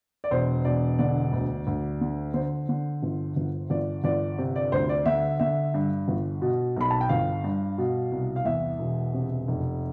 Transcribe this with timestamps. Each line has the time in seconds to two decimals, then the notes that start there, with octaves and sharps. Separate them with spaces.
0.24 D5
0.31 E1 C5
0.65 E1 D5
0.99 D3 D5
1.32 D2
1.67 D2
2.01 D3
2.34 D3 C5
2.69 D3
3.03 G1
3.36 G1
3.70 G1 D5
4.04 G1 D5
4.38 C3
4.56 D5
4.72 D2 C5
4.89 D5
5.06 D3 E5
5.40 D3 E5
5.74 G2
6.08 G1
6.42 B2
6.76 B1 B5
6.91 A5
7.01 G5
7.09 G1 F5
7.44 G2
7.78 B2
8.12 C2
8.36 F5
8.45 E2 E5
8.79 E1
9.14 C3
9.48 F1